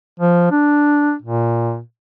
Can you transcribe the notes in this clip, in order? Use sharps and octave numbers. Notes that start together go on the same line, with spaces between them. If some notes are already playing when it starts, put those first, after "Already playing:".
F3
D4
A#2